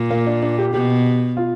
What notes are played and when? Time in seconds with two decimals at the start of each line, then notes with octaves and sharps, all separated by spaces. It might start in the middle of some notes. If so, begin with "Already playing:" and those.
Already playing: A#2
0.11 A#3
0.27 D4
0.42 D4
0.58 G4
0.73 B2 G4
1.37 F4